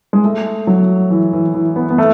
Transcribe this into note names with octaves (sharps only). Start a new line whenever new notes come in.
G#3
A3
F#3
E3
E3
E3
B3
B3
A3